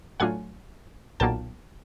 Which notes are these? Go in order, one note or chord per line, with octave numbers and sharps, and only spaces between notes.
A2 F#3 A3 D4 F4 F#5 G#5
B1 A#2 F#3 A#3 G5 A5